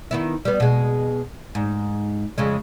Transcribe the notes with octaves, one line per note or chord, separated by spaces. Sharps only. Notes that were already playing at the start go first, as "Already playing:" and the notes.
D#3 B3 E4
G3 B3
B2 G#3
G#2
F2 C#3 G#3